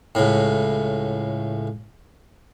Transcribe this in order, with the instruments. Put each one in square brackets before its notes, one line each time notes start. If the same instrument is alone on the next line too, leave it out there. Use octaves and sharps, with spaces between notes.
[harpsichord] C#2 A2